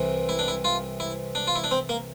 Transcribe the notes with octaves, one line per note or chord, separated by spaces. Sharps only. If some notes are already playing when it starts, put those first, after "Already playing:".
Already playing: C2 C3 E3
E4
D4
E4
F4
E4
D4
F4
E4
D4
C4
A#3